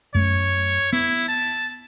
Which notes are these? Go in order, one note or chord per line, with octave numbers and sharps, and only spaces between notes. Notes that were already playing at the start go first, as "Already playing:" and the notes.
F#2 A3 C#5
B3 E4
A5